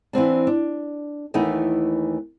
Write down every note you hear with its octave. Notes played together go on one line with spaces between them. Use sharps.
E3 B3 C4 D4
D4
D#2 E3 A3 B3 D#4